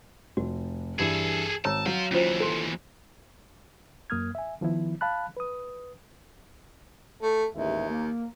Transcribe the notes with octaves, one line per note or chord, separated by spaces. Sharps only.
F1 F#4
G2 E3 G#4 A4
G#1 C#5 A5 A#5 E6
F#3 C5 F5 F#5
D#2 E3 C#4 F4 C5
A4 C6
F#2 A#3 D#6 F6 G#6
E5 G#5
D#3 F3 B3 E4
F5 A5 B5 F#6
B4 D#6
A3
A1 D#2 G#3 E5
A#3